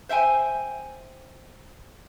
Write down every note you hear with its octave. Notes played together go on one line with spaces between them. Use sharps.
C5 E5 G5 G#5